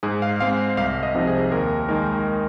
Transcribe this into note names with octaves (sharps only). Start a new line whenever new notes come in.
G#2 G#4
F5
G#3 C4 F5
C2 F5
D#5
C3 F3 C4 D#4
G#4
D#2 A#4
D#3 G#3 D#4 A#4